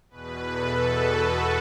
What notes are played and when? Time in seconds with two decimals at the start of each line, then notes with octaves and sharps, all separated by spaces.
0.10 E2 B2 B4
0.57 A4
1.04 F#4